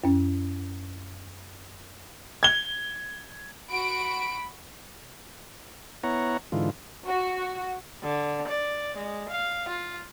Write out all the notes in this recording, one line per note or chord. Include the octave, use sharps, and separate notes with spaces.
F#2 C#4
G#6 G7
F#4 B5 D7
B3 E4 C#5 F#5 A#5
G#2 D3 E3 F4
F#4
D3
D5
G#3
F5
F4